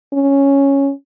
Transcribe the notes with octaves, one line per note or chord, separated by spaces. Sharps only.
C#4